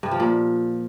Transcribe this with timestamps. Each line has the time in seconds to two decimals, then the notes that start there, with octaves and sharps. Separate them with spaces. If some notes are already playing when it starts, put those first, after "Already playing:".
0.03 G2
0.11 F3
0.20 A#2